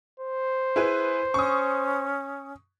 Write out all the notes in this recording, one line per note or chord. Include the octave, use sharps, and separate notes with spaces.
C5
E4 G#4 B4
C#4 C#6 D#6